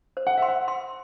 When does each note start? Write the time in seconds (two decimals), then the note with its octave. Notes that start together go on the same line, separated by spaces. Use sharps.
0.17 C5
0.27 F#5
0.38 E5 C6
0.48 F#5
0.68 C6